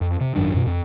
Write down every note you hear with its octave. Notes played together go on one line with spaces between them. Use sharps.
F2
C3
G#1 F#2 D#3 D4
F#2 B2
F2